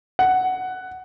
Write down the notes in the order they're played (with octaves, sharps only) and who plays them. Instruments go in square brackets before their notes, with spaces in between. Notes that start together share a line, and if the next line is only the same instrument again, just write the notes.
[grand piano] F#5